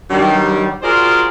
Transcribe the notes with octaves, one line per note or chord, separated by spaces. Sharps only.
G2 D#3 F#3 G3
F4 F#4 G#4 A#4 C5 D5